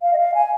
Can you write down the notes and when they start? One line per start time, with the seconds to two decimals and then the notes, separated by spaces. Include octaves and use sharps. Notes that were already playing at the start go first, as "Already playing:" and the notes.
0.02 F5
0.13 D#5
0.19 F5
0.34 G#5